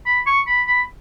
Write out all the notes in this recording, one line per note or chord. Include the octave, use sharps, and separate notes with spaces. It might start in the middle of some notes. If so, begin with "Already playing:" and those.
B5
C#6
B5
B5